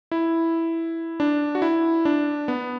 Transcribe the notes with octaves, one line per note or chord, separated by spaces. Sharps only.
E4
D4
F#4
E4
D4
B3